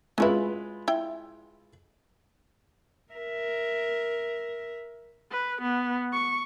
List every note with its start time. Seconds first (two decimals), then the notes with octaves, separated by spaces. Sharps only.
0.18 F#3 G#3 C#4 E4 F4 B4
0.88 E4 G5
3.13 A#4 E5
5.31 B4
5.62 B3
6.12 C#6